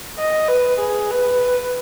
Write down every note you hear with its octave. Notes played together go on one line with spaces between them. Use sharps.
D#5
B4
G#4
B4